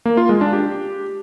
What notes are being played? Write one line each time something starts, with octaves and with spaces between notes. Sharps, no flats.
A#3
F4
G#3
D4
G4